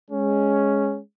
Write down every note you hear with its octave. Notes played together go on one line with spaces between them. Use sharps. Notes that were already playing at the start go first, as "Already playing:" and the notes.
G#3 C#4